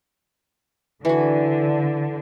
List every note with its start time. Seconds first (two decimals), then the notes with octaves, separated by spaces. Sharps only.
1.05 D3 E3 F#4